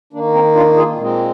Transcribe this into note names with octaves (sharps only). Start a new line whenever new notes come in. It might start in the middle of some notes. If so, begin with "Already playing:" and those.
D#3 A#3 D4
C4 D#4
D4 F4
F4 G#4
A#2 G#3 C4